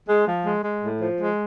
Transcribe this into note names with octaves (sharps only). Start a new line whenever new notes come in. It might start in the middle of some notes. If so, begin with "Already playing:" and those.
G#3
F3
G#3
G#3
A2
F3
G#3